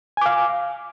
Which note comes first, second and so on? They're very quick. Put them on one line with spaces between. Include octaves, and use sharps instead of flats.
G#5 D6 F5